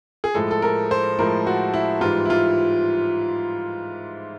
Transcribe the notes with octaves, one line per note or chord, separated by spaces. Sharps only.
G#4
A2 F3 G#3 A4
A4
A#4
C5
A2 F3 G#3 A#4
F#4
E4
G#2 E3 G3 F4
E4
F4